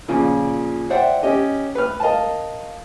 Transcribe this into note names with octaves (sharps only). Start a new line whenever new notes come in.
A#2 C#3 F3
C5 D5 E5 F#5 G5
C#4 G4 D#5
B4 F6
A#4 D#5 F5 A5